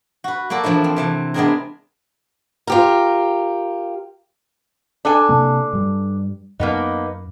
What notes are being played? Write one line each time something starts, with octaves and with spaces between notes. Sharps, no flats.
F#4 B4
A#3 F#4 A4 D5
E3 F3 A3 D4 E4
C4
C3 E3 A5
G#3 B3 C4 D4 G#4 A#4
F4 G4 A#4
D4 A4 G#5
C3 A#3
G2 G3
F#2 A#3 B3 D#4